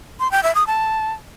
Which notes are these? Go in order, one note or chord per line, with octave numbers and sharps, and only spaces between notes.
C6
G5
E5
D#6
A5